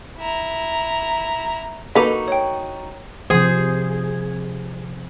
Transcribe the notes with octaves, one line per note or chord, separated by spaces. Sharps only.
E4 A#5
A#3 D#4 F#4 A4 B4 A#5 D6 B6
C#5 G5
C3 F3 G#4 C5